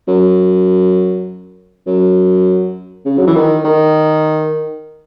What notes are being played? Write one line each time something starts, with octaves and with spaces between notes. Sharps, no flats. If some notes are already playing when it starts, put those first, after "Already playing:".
F#2
F#2
C#3
F#3
E3
D#3
D#3